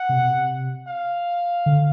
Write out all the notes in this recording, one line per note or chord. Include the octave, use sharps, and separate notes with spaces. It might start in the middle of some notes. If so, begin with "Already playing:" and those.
Already playing: F#5
C3
B2
C3
F5
D3